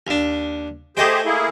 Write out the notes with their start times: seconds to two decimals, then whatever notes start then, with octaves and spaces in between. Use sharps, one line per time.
0.07 D#2 D4
0.97 A3 G4 G#4 C5 D#5 G5
1.26 A#3 E4 G#4